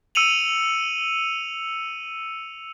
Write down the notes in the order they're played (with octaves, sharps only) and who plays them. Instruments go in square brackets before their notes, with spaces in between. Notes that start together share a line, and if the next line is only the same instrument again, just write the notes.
[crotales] E6 C#7 D#7 F7 F#7